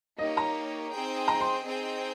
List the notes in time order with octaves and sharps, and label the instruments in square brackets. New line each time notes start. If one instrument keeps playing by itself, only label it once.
[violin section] A#3 D#4 G4 C#5 [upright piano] D#5
[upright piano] A#5
[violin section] C4 D#4 G#4 C5 G5
[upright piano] A#5
C6
[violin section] C4 D#4 G#4 C5 G5